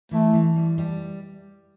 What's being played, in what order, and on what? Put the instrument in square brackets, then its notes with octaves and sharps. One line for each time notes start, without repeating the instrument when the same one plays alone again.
[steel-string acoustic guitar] E3 [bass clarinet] A3
[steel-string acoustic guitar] E3
G3
G3